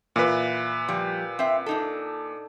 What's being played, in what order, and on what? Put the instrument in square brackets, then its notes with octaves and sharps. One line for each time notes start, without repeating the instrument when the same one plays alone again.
[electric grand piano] A#2 B4 [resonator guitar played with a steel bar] E3
[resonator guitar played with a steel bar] F3 G3
C4 E5
D4 D#4 A4